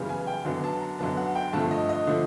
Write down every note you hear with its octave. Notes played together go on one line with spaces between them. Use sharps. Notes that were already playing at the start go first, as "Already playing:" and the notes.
Already playing: F#2 C#3 E3 G3 B3
G#5
G5
F#2 D3 F#3 B3
A5
A#5
F#2 D3 F#3 B3 A5
F#5
G5
G2 D3 F3 A3 A5
D#5
D#5
D3 F3 A3